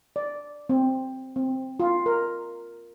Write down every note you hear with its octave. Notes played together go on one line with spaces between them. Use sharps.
D5
C4
C4
F4
A#4